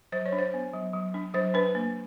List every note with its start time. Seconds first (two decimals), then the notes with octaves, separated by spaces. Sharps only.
0.12 F#3 C5
0.26 C#5
0.32 D4
0.39 C5
0.54 B3
0.74 F#3
0.93 F#3
1.14 D4
1.34 F#3 C5
1.54 D4 B4
1.75 A#3